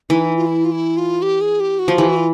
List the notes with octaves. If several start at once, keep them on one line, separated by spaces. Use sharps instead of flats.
E3 D#4
F4
E4
F4
E4
F4
G4
G#4
G4
F#4
F3
E3 G4
F#4
F4